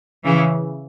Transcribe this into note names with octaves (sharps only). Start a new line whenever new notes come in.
C#3 E3